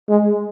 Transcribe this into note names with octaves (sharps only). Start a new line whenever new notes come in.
G#3